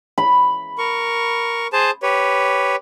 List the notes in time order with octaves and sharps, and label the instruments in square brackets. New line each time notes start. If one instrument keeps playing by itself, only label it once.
[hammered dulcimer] B5
[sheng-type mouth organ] A#4 C#6
G#4 C5 A5
G4 B4 C#5